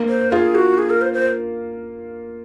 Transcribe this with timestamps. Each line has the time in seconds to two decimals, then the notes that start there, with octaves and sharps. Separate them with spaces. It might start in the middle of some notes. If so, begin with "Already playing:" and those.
Already playing: A#3
0.09 C5
0.32 F4 G#4
0.55 F#4
0.78 G#4
0.90 A#4
1.02 C5
1.13 C5